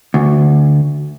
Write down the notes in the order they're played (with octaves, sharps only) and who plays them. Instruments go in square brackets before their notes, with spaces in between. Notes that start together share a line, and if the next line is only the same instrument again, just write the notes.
[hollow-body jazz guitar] D2